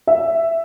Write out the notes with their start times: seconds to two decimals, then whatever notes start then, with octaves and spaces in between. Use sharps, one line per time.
0.07 E5